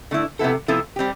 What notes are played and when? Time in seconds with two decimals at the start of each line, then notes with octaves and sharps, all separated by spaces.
0.11 D3 A3 E4
0.39 C3 F3 B3 E4 A4
0.68 C3 F3 B3 E4 A4
0.96 G3 C4 G4